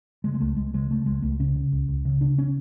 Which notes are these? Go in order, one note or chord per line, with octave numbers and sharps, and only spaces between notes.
C#3 G#3
G#3
C#2 A3
C#2 G#3
C#3 G#3
C#3 A3
C#2 G#3
C#2 A3
C#3 C#4
C#3
C#2
C#2
C#3
C#3 D4
C#4